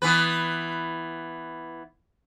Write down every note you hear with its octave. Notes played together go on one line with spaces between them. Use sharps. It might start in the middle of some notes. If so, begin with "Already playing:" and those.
E3 B3 B4